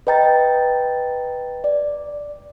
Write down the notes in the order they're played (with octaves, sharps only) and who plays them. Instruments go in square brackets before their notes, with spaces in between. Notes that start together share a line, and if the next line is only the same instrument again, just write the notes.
[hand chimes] B4 D#5 G5 A#5 A6
D5